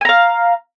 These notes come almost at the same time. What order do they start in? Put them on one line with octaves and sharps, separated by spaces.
G#5 A#5 F5